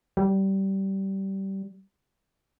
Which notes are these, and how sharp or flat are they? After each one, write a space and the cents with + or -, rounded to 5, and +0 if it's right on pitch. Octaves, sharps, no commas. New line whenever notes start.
G3 -20